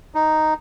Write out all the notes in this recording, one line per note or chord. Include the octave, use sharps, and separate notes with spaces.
D#4